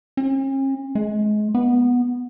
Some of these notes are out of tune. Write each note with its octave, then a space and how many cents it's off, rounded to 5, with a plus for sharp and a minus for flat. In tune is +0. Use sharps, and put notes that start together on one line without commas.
C#4 -45
G#3 +30
B3 -10